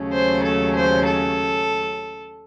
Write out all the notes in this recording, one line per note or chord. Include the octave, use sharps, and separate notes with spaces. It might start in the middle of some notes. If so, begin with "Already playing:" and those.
Already playing: D#2 C#3 F#3 A3 C#4
C5
A4
C5
A4